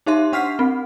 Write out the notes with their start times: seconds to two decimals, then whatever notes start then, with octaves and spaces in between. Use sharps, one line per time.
0.06 D#4 G4 E5 C6
0.33 D4 F#5 F6 B6 C7
0.59 C4